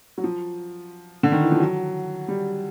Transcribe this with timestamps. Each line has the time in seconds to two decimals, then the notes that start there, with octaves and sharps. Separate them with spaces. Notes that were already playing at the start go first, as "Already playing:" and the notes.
0.18 F#3
0.24 F3
1.23 D3
1.32 D#3
1.42 E3
1.52 F3
1.60 F#3
2.28 G3